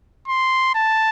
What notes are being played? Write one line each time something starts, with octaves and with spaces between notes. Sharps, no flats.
C6
A5